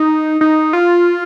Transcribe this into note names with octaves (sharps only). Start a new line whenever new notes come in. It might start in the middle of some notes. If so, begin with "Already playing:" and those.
Already playing: D#4
D#4
F4